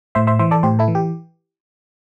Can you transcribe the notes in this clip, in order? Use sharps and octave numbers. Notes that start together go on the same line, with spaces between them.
A2 C5 E5
C5 E5
E3 C5 E5
A4 D5
A2 G4 C5
E4 A4
E3
G4